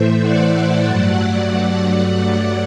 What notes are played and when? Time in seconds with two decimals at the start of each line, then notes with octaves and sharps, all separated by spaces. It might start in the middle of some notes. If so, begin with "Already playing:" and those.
Already playing: A2 E3 A3 C5 E5
0.21 D5 F#5
0.87 G2 F#3 A3